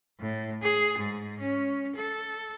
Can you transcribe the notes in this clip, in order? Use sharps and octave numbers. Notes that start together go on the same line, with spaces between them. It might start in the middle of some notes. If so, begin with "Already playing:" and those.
A2
G#4
G#2
C#4
A4